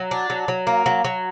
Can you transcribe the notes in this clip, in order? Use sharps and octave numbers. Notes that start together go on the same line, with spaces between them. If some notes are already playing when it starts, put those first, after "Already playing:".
Already playing: F#3
D4
F#3
F#3
A#3
F#3
F#3